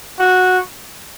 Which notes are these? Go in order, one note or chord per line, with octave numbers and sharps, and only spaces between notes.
F#4